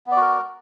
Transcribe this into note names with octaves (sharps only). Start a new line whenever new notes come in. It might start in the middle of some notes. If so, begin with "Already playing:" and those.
B3 F#4 A#4 D5